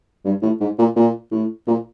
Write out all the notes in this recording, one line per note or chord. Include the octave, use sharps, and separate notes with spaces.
G2
A2
G#2
A#2
A#2
A2
A#2